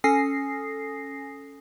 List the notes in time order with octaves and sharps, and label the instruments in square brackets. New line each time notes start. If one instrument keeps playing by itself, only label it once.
[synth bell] C#4 A4 G#5 D#6 A#6 C7